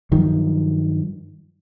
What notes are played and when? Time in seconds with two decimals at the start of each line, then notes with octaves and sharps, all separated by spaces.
0.11 G2 D#3 F3 F#3